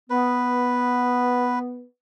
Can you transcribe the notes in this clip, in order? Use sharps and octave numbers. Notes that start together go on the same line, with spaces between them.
B3 B4